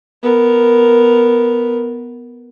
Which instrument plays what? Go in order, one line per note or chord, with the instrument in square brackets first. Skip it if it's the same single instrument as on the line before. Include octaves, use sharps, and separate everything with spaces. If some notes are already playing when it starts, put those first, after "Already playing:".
[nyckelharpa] B3 A#4